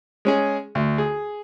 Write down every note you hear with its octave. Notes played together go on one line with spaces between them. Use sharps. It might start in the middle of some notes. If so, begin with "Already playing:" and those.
G#3 C#4 G#4
D2
G#4